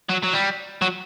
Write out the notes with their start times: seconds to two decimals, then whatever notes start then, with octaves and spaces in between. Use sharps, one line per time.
0.09 F#3
0.23 F#3
0.33 G3
0.82 F#3